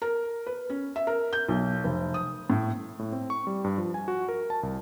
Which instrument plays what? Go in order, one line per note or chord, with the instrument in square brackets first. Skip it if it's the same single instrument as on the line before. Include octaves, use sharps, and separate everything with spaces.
[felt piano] A#4
B4
C#4
E5
A#4
G6
B1
F1
D#6
A2
[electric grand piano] A2
C4
C#6
G3
G2
F3
G#5
F#4
A#4
A5
C2